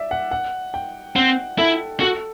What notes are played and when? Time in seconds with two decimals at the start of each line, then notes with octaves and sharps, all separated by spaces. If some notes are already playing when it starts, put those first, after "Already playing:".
Already playing: D5 E5
0.11 F#5
0.31 F#5
0.74 G5
1.16 C4 F#5
1.58 E4 A4
2.00 F#4 A4